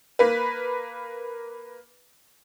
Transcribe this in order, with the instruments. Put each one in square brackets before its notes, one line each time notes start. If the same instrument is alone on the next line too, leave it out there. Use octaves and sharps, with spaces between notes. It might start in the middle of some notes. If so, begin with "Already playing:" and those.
[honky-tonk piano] A#3 B4